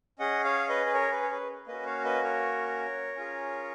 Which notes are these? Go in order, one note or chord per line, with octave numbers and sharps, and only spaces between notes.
C#4 G#4 D#5 F#5
C#5 F5
B4 D#5
B4
A#4 C#5
B4
C#5
B4
A#3 C#4 F#4 B4 D#5
C#5 F5
B4 D#5
A#4 C#5
C#4 F4 G#4